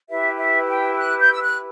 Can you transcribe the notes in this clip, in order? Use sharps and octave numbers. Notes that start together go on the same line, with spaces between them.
E4 G4 B4 E5
E5
G5
F#6
G6
E6
F#6